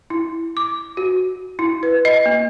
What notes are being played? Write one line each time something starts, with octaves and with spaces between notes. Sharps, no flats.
E4
D6
F#4
E4
B4
D#5
A#3